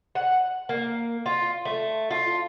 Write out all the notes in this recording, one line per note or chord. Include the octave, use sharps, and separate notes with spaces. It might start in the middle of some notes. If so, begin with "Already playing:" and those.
F#5
A#3
F4
A3
F4